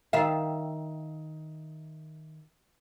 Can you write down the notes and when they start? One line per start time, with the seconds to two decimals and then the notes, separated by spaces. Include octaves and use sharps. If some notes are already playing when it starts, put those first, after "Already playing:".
0.13 D#3 E5 F5